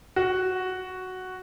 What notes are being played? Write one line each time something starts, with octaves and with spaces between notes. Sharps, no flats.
F#4